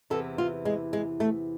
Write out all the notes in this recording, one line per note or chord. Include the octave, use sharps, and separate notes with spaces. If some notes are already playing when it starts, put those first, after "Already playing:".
E2 C3 E3 A4
F4
G#3
G#3
A3